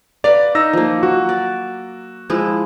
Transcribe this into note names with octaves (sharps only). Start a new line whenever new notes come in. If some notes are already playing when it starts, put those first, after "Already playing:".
B4 D5 F5 A#5
D#4 E6 A#6
F3 A#3
F#3 F#4
D5
F3 G#3 E4